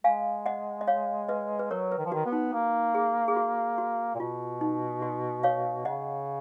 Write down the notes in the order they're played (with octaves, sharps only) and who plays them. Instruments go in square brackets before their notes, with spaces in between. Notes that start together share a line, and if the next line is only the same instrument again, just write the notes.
[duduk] G#3 [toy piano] F5 G#5
[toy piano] D#5 F#5
D#5
C#5 F5
B4 D#5
B4
[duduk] F#3 [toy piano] A#4 C#5
[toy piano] B4
[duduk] D#3
F3
[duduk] D#3 [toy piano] F#4
[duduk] B3
[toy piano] D#4
[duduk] A#3
[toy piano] G#4
G#4
F#4
F#4
[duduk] A#2
[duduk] B2 [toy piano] F4
[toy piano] D#4
F#4
C#5 F5
[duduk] C#3 [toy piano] D#5 F#5